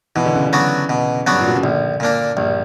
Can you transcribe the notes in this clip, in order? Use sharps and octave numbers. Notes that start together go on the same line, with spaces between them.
B2 E3
D3
C#3
D3
F#3 B3 D4 F#4
B2
F#3 B3 D4 F#4
G2
A#2
B2
C#3
A#1 D3
A#2 A#3 D4
A#1 G2